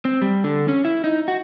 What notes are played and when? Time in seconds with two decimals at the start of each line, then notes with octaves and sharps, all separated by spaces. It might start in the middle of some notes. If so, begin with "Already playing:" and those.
0.05 C4
0.22 G3
0.44 D3
0.68 C#4
0.85 E4
1.04 D#4
1.28 F#4